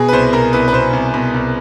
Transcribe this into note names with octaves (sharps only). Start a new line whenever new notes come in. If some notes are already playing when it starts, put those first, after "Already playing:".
Already playing: B2 G#4
B4
C2 C5
B2 A#4
C2 B4
B4
B2 C5
C2
B2
C2